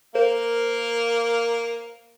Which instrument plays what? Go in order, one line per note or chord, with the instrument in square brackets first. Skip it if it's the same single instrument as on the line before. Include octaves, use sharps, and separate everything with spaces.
[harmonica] A#3 F5 [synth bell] A#4 C5